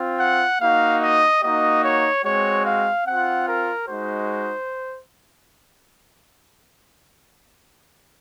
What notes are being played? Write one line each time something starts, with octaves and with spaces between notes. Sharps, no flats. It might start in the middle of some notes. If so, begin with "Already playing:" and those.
Already playing: C4 F4
F#5
A#3 D#4 F#4 F5
D#5
A#3 D#4 F#4 D#5
C#5
G#3 C4 F#4 C#5
F5
C4 F4 F#5
A#4
G#3 D#4 F#4 C5